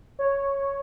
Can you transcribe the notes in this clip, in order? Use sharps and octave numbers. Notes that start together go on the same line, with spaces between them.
C#5